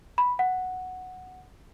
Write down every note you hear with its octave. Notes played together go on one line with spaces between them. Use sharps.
B5
F#5